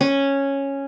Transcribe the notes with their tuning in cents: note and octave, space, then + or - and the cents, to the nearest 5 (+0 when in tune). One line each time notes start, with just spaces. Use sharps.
C#4 -5